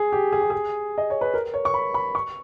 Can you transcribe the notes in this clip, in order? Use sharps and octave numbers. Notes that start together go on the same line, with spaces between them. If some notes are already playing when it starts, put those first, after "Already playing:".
Already playing: G#4
G4
G#4
G4
G#4
D#5
C#5
B4
A#4
C#5
C#6
B5
B5
C#6